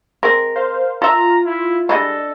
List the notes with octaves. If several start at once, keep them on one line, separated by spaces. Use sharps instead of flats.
G#3 C4 A#4
C5 F5
F4 A4 E5 A#5
E4
G3 G#3 D4 E4 A4 D#5